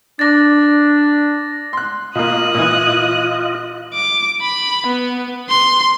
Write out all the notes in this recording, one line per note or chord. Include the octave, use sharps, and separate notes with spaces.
D4 A6 A#6
C6 F#6
B2 A#3 F4 D#5 D#6 F#6
A#2 E3
D6
B5
B3
C6